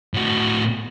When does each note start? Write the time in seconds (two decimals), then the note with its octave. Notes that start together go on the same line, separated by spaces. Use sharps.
0.14 A2 F#4